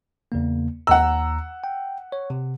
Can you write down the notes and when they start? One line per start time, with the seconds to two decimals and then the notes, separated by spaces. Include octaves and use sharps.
0.32 E2 C#3 A#3
0.87 D#2 F#5 A#5 E6
1.64 G5
2.12 C#5
2.30 C3